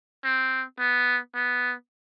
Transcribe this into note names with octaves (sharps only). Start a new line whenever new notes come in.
C4
B3
B3